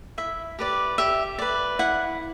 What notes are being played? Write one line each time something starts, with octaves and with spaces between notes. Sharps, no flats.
E4 E5
G4 B4 D5
G4 E5
B4 D5
E4 F#5